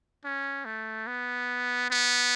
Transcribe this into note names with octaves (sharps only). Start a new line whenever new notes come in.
C#4
A3
B3
B3